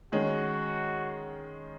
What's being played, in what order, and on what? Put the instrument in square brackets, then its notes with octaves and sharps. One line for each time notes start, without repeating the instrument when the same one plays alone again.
[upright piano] D#3 G#3 C#4 [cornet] F#4